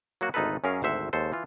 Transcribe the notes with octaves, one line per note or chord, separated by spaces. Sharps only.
F#3 A#3 F#4
G#1 D2 D#4 F4 A4 B4
F#2 C#4 G#4 A#4 F5
G#1 D2 C5 E5 F#5
D#2 G#3 A4 C5
E3 F4